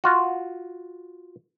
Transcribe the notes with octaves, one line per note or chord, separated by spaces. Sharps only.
F4 F#4